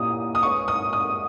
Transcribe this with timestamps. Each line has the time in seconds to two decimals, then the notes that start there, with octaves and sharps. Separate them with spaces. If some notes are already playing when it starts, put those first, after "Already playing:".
Already playing: A#2 A#3 C#4 E4 G4 D#6
0.35 D#6
0.43 G#3 C#4 G#4 B4 C#6
0.68 D#6
0.93 D#6